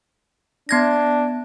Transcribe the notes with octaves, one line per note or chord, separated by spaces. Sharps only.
B3 D4 G#6 A#6